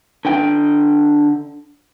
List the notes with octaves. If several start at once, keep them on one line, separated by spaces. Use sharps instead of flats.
D3 G5